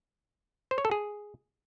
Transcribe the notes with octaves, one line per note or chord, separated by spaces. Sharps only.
C5
C#5
A4
G#4